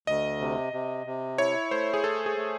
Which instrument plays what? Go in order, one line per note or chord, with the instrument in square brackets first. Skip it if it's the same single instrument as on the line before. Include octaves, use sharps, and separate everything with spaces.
[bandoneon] D2 [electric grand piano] D#5
[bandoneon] C3
C3
C3
[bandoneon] E4 [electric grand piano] C#5
[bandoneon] A3 [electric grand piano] C5
[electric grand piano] G#4
[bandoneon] A3 [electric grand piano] A4
[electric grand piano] G#4
[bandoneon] A3